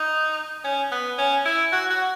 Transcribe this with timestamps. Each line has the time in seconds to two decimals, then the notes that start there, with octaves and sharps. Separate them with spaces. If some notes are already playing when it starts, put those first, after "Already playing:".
Already playing: D#4
0.64 C#4
0.91 B3
1.18 C#4
1.45 E4
1.72 F#4
1.90 F#4